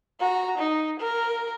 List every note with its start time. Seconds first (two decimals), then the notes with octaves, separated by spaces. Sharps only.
0.20 F#4 A#5
0.58 D#4
1.00 A#4